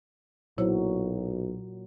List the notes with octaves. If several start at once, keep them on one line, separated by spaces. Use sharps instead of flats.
B1 A#2 F#3 E4 C5 C#5